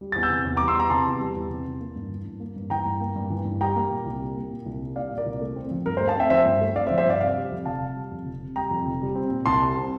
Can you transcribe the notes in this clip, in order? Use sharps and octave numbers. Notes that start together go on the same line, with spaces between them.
G3
E2 A6
E6 G6
C3
E2
G3 A#5 D6
C6 E6
E2 A#5 D6
C3 A5 C6
E2
G3
E2
C3
E2
A#3
G2
E3
G2
A#3
G2
E3 G5 A#5
G2
A#3
G2
E3
G2
G3 G5 A#5
A#3
A#2
C2
G3
A#3
A#2
C2
G3
A#3 D5 F5
A#2
A#4 D5
C2
A3
C4
F3
G2 A#4
C5
A3
F5 A5
C4 E5 G5
F3 C5 E5
G2
A3
C4 D5 F5
C5 E5
F3
C5 E5
G2 D5 F5
C3 D5 F5
G3
F2
F1 F5 A5
C3
G3
F2
F1
C3
G3 G5 A#5
F2
F1
G3
C4
A#2
C2 A5 C6
G3
C4